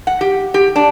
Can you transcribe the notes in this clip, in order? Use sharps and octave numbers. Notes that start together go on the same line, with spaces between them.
F#5
G4
G4
D4